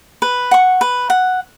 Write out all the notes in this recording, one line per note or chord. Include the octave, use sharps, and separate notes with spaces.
B4
F#5 C#6
B4
F#5